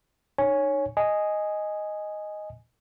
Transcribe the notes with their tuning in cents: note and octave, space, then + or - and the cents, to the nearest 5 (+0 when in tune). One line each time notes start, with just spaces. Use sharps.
D#4 -30 C#5 +0 G#5 +0
D#5 +0 G#5 +0